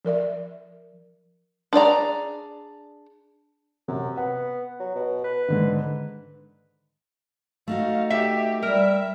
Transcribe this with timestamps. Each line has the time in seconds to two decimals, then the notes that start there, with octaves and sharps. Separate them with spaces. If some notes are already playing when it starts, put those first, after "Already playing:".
0.05 F3 A#4 D5 E5
1.73 D4 G#4 D5 A#5
3.88 F#2 C3
4.17 B3 F#5
4.80 F#3
4.95 B2
5.24 B4
5.48 G#2 D3 D#3
7.68 A3 D#4 F#4 F5
8.10 G4 E5
8.63 G3 A#4 E5